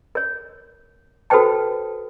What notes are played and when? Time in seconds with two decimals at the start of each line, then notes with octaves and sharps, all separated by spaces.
0.15 A#4 C#5
1.30 F#4 A4 B4 C5 G5 A5